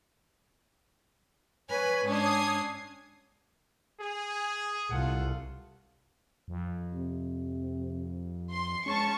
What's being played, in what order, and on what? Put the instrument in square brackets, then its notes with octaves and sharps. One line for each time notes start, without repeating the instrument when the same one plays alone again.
[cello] B4 [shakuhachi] C#5 [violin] G#5
[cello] G#2 [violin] C#4 D4 [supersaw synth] D#6 G#6 C7
[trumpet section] G#4
[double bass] C2 [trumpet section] F4 A4 F#5
[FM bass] F2
[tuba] C3
[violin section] C6
[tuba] G#3 [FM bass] C#4 [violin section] A5 C#6